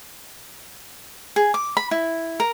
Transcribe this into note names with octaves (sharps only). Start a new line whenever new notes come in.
G#4
D6
B5
E4
A#4